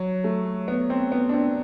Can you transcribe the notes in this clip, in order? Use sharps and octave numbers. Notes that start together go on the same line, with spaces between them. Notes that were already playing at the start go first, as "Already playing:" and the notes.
Already playing: F#3
A3
B3
C4
B3
D4
C4